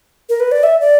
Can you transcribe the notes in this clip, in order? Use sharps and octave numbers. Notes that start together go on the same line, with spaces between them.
A#4
B4
D5
E5
D5